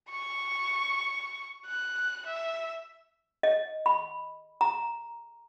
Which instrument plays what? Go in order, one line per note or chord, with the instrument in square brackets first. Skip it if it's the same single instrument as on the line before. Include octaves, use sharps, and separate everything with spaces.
[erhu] C#6
F#6
E5
[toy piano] D#5
B5
A#5